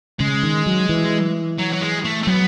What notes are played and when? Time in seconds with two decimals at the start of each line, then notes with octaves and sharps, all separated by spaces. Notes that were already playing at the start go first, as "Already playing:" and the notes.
0.20 C#3 G#3
0.43 D#3
0.66 F#3
0.89 E3
1.59 F#3
1.73 F#3
1.81 G#3
2.04 A3
2.23 A3
2.27 F#3 B3